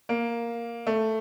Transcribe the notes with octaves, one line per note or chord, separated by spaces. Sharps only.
A#3
A3